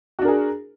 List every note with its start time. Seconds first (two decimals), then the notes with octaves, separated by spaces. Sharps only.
0.19 F#4
0.22 D4
0.25 A#4
0.28 G#4